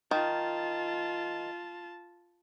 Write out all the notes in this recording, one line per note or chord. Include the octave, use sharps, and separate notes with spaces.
D#3 F4 A5